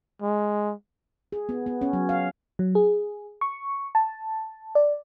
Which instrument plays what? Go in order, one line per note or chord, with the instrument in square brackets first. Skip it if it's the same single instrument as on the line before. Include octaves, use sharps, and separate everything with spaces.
[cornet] G#3
[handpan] G#4
B3
B3
C#4
F#3
F5
[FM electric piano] F#3
G#4
C#6
A5
D5